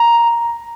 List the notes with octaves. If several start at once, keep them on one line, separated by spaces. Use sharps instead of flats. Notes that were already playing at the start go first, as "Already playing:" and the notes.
Already playing: A#5